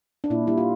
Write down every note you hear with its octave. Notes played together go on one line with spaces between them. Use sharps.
D4
A#2 E4
G3 E4
F4